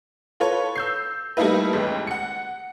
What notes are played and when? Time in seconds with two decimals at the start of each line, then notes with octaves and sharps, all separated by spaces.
0.40 F4 A4 B4 C#5
0.76 E6 G6 C7
1.37 G3 A3 A#3 D#4 E4 B4
1.73 A1 D#2 G#3
2.07 F#5 C#7